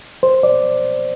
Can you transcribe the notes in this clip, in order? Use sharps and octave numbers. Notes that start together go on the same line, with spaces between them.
C5
D5